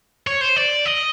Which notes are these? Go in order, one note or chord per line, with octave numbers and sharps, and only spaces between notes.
C#5
C5
D5
D#5